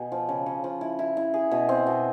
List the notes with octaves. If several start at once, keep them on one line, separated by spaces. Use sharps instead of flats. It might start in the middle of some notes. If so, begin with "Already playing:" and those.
Already playing: B2 G#4
F3
C#3
C#3
F3
E4
E4
E4
G#4
B2
C4
B2